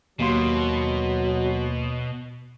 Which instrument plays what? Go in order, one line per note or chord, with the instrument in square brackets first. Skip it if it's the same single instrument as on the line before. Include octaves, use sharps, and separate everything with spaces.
[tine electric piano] D#2 A#3 C6 [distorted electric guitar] B2 [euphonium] F#3